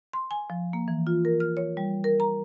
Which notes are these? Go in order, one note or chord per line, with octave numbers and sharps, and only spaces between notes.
C6
G#5
F3
A#3
E3
F4
A#4
F6
C#5
G3
A#4
A#5